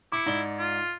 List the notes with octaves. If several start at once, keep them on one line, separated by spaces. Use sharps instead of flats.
E4 D6 C#7
G#2 D5 G7
F4